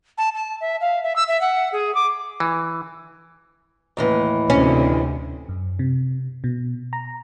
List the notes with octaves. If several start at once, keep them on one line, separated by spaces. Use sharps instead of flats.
A5
A5
E5
F5
E5
E6
E5
F#5
G#4
D6
E3
D#2 A2 E3
D2 C3 C#4
F#2
C3
B2
A#5